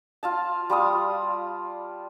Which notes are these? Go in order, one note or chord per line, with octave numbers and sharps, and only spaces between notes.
F4 F5 A5
G3 F4 A5 D#6